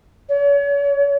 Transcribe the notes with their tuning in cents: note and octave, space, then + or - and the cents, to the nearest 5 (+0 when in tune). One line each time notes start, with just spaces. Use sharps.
C#5 +35